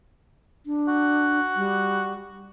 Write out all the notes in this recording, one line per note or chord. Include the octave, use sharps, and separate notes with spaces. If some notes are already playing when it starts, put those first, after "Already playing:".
D4
F#4
G3